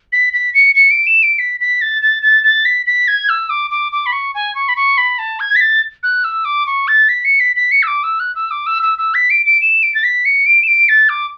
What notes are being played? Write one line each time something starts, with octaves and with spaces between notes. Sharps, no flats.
B6
B6
C#7
C#7
D7
E7
D7
B6
B6
A6
A6
A6
A6
B6
B6
G#6
E6
D6
D6
D6
B5
C#6
G#5
C#6
B5
C#6
B5
A5
G#6
B6
A6
F#6
E6
D6
C#6
A6
B6
C#7
B6
B6
C#7
E6
D6
E6
F#6
E6
D6
E6
E6
E6
B6
D7
D7
E7
D7
A6
B6
C#7
D7
E7
D7
A6
D6